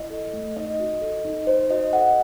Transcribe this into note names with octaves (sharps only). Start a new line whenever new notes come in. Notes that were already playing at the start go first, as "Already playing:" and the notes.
Already playing: E4 D#5
A4
A3
D#4 D#5
F#4
A4
D#4
D#4 C5
F#4 D#5
A4 F#5